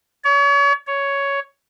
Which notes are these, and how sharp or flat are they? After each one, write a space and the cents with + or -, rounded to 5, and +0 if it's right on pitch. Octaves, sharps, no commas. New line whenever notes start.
C#5 +35
C#5 +10